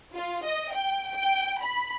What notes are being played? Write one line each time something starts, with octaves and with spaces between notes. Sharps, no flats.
F4
D#5
G5
G5
B5